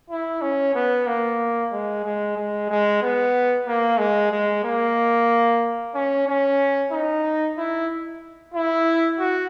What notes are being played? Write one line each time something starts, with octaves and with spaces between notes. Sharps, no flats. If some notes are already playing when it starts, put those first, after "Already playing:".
E4
C#4
B3
A#3
G#3
G#3
G#3
G#3
B3
A#3
G#3
G#3
A#3
C#4
C#4
D#4
E4
E4
F#4